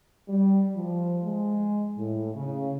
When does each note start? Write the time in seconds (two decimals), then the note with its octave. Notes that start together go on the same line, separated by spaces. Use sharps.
0.28 G3
0.75 F3
1.24 G#3
1.97 A2
2.35 C#3